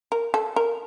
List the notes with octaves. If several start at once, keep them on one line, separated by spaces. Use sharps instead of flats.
A#4
A4
A#4